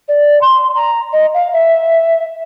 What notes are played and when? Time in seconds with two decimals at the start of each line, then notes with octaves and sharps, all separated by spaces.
0.08 D5
0.41 C6
0.75 A#5
1.12 D#5
1.34 F5
1.53 E5